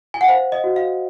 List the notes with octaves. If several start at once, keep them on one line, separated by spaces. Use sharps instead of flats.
G#5
F#5
C5 F5
D#5
F#4
F5